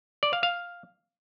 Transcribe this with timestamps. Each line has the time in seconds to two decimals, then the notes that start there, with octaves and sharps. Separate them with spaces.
0.23 D5
0.33 F5
0.43 F5